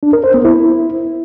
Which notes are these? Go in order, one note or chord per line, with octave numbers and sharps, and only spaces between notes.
D4
A#4
C5
B3
E4